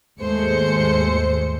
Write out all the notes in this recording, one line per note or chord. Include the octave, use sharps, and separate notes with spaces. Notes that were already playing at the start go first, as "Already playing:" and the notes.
D#2 G#2 G#3 A3 C5 C#7